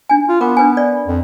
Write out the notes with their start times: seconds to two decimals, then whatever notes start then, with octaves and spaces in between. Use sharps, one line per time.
0.09 D4 G#5
0.29 F4
0.41 B3 A#4 D6
0.57 D4 B4 G#5
0.77 D5
1.07 F2